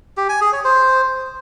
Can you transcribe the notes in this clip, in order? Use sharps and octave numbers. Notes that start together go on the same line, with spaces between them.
G4
G#5
G#4
C#5
C5